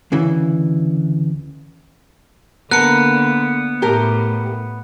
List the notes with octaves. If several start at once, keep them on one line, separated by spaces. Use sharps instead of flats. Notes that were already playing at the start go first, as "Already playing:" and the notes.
D2 C#3 E3
D3 A#3 B3 A#4 F#6 C#7
A2 G4 A#4